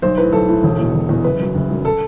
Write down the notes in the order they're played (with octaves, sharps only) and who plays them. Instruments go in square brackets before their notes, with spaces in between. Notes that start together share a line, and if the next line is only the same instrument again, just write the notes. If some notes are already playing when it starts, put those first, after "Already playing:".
[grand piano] B1 C5
A2 E3 B4
B1 A4
A2 E3
E1
E2 B2
E1
E2 B2
F#1 B4
F#2 F#3
F#1
F#2 F#3
A4